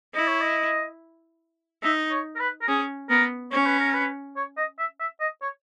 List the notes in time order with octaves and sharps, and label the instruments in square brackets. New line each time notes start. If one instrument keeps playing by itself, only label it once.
[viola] E4 [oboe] D#5
[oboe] C#5
D#5
[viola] D#4 [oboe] E5
[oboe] C#5
A#4
B4
A#4
[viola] C#4 [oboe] G#4
[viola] B3 [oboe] A#4
[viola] C#4 [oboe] C#5
[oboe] B4
A#4
B4
C#5
D#5
E5
E5
D#5
C#5